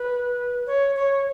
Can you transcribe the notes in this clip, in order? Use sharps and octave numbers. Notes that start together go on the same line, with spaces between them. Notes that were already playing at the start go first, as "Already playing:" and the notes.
Already playing: B4
C#5
C#5